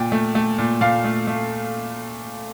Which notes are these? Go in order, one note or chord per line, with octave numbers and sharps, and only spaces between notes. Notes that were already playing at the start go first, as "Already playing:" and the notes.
Already playing: A#2 G5
A3
A3
A#2
A#2 F5
A3
A3